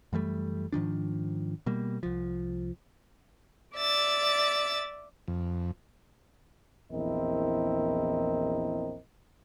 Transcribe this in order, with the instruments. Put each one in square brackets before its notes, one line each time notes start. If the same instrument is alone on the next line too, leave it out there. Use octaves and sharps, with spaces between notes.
[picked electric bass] F#2 E3 G3 A3
G#2 D#3 F3 D4
B2 G3 A#3
C2 F3
[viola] D5 [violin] E5 A6
[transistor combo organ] F2
[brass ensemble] A#1 E2 C4 E4 A#4 D#5